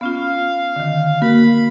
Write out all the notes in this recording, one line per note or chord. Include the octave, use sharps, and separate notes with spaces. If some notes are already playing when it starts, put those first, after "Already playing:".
B3 C#4 F4 F5
D3 D#3
A#3 F#4 A#4 B5